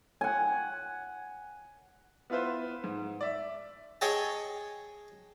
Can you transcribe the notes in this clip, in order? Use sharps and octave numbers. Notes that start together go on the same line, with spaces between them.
F#5 G#5
B3 E4 F4 B4 C5
G#2
D5 E5
G#4 C#5 D#5 G5 A5